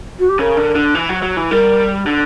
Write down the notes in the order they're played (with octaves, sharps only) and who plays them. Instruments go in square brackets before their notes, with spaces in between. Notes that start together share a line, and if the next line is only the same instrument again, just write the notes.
[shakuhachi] F#4
G4
[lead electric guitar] C#3 [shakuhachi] A#4
[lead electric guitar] D3
D3
E3
F#3
F#3
E3
[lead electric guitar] G3 [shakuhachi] A#4
[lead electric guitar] D3